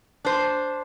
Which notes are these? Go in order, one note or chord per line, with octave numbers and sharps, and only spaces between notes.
D4 C5